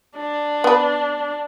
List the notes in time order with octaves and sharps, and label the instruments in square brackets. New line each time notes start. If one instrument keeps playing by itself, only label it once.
[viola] D4
[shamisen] B3 B4